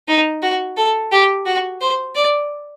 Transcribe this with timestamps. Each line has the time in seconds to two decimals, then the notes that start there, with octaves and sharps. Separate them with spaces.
0.08 D#4
0.42 F#4
0.77 A4
1.12 G4
1.46 F#4
1.81 C5
2.15 D5